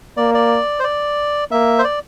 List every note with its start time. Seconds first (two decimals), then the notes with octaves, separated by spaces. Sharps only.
0.17 A#3 D5
0.35 D5
0.80 C5
0.84 D5
1.51 A#3 E5
1.79 C5
1.84 D5